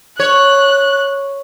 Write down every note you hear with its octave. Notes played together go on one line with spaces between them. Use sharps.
C#5 F#6